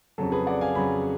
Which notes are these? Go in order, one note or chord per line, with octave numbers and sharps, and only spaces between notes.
F2 C#3 F#3 A4
G#4 B4
D5 F#5
F5 G#5
F2 C#3 F#3 G#5 B5